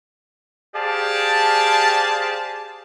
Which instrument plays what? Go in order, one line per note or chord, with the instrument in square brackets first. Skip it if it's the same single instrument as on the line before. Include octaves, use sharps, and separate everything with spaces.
[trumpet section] G4 G#4 C5 D5 F5 A5